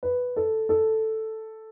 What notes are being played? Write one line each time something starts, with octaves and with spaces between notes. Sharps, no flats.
B4
A4
A4